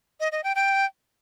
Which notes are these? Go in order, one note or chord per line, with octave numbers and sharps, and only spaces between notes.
D#5
D#5
G5
G5